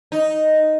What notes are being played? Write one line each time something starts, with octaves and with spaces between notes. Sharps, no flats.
D#4